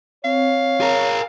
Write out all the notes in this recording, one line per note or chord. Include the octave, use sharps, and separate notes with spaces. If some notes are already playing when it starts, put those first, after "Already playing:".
C4 C#5 F5
G#4 A#4